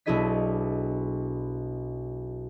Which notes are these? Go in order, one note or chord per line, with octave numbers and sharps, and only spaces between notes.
B1 D4 E4 G#4 D#5 B6